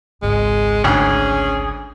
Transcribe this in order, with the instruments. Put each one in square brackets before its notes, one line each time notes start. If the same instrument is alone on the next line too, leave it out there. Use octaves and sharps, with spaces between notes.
[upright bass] G#1 C#2 [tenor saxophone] G#3
[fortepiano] D2 G#2 [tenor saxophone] C#4 [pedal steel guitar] G#4